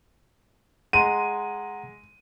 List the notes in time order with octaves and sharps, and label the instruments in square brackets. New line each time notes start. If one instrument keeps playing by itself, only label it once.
[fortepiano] G#3 [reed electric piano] F#5 A#5 C6 [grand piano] D#7